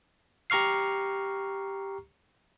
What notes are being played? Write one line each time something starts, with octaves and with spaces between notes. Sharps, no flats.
G4 A#5 C#6 F6 C7